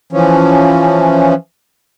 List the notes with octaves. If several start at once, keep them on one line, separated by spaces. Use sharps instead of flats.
E3 F3 C#4